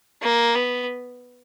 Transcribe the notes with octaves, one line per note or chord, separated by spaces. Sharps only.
A#3
B3